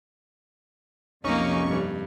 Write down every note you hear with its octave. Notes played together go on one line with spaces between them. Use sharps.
B1 F2 C3 A#3 C#4 D#4 C#6
G2